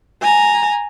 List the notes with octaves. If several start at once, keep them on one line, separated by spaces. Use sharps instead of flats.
G#5 A#5